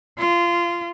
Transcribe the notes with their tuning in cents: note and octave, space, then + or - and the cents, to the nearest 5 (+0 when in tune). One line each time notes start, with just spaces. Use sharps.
F4 -20